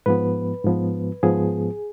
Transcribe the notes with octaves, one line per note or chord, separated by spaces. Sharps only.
G#2 F3 B3 B4
G#2 F3 B3
G#2 F3 B3 G#4